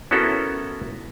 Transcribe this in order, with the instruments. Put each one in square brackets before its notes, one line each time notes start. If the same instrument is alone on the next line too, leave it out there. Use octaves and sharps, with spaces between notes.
[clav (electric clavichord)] B3 C#4 E4 F#4 A4 A#4